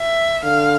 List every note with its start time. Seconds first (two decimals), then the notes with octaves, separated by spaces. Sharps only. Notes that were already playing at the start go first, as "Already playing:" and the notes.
Already playing: E5
0.44 D3 F5